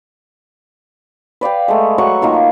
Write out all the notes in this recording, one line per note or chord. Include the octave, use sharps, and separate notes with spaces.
B4 D5 F5 G5
G#3 A3
F#3 F#5 C#6
D#3 A#3 F4